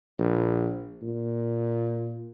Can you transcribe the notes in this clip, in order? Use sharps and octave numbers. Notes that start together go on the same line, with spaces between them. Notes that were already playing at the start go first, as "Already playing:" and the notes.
A#1
A#2